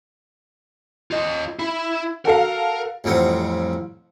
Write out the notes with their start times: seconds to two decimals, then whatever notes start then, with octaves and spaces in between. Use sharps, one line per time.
1.11 F4 D#5
1.59 E4
2.25 F#4 A4 A#4 F5
3.04 A1 F2 G3 C4 F#5